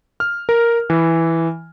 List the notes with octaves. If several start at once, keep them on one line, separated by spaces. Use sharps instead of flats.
F6
A#4
E3